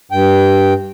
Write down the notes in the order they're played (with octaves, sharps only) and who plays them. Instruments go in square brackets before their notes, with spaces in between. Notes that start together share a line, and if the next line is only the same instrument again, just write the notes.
[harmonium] G2 G5